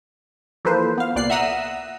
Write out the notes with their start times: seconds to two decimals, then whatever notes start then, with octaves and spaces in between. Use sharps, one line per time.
0.65 E3 F3 A#3 A4 B4 C5
0.98 B3 F5
1.15 C2 A#2 D5 F#6 C7
1.30 E5 F#5 A#5 D#6 E6 F#6